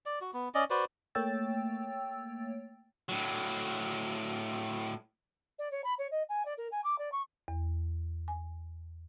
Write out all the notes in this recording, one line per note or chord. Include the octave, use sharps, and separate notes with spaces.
D5
F#4
B3
C#4 D5 D#5
F#4 B4 C5 D5
A3 A#3 C#5 G5 E6 A6
A2 F#3
D5
C#5
B5
C#5
D#5
G#5
D5
A#4
G#5
D6
D5
C#6
E2
G#5